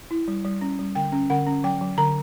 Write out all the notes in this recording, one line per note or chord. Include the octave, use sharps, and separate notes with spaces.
E4
G3
G3
C#4
G3
D3 G5
C#4
D3 F#5
C#4
F#3 G5
F#3
D3 A#5